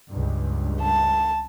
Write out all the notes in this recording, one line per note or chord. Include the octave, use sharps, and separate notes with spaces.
C#2 G2
A5